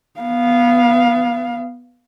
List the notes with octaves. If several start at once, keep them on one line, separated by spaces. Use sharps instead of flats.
B3 F5